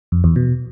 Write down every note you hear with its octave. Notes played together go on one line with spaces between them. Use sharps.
F2
E2
B2